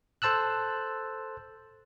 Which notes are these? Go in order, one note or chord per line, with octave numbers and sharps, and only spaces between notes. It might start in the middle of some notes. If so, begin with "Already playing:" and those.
A4 C5 A5 E6 F#6